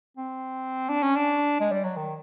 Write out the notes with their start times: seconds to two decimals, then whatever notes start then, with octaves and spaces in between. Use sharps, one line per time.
0.17 C4
0.89 D4
1.03 C#4
1.16 D4
1.61 G#3
1.72 G3
1.84 F#3
1.97 D#3